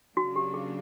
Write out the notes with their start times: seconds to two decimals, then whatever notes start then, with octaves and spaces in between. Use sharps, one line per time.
0.16 C#3 F#3 A#3 D4 F#4
0.36 G4
0.54 G#4